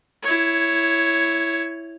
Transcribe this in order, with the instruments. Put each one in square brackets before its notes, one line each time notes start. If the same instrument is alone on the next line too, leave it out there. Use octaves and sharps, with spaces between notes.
[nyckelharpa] E4 C#5